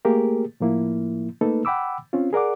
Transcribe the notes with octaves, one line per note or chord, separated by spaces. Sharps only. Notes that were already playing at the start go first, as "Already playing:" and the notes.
A3 A#3 G4 G#4 A#4
A2 F3 A#3 E4
A3 A#3 D#4 A4 B4
F#5 G5 B5 D6 E6
C4 C#4 F4
G#4 A#4 D5 F#5 D6